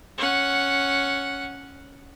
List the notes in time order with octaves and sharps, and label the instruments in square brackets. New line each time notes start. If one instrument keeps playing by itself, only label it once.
[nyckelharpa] C#4 F#5